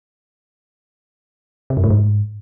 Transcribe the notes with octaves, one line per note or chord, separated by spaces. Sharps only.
C3
F#2
A2
G#2